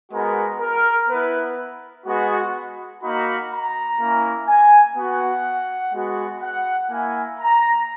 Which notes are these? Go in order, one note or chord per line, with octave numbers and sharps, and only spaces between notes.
G#3 B3 F#4 A#4
A#4
B3 E4 B4
G#3 B3 F#4
A#3 D#4 F#4 B5
A#5
A#3 C#4 E4
G#5
B3 F#4 F#5
G#3 B3 F#4
F#5
A#3 E4 G#5
A#5